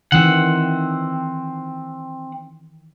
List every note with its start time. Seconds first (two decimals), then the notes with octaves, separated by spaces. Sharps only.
0.12 D#3 E3 C4 F#5